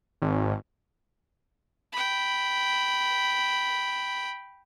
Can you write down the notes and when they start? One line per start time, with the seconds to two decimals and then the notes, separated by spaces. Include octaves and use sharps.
0.22 G#1
1.92 G5 B5